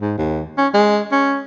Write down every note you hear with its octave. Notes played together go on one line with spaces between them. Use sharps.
G#2
D#2
C#4
G#3
C#4